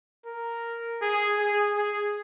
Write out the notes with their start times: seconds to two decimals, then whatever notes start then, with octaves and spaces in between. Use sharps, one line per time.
0.26 A#4
1.02 G#4
1.38 G#4
1.76 G#4